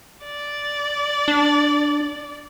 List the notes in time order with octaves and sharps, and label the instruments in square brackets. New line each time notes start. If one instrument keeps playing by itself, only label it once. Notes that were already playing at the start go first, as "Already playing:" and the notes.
[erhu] D5
[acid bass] D4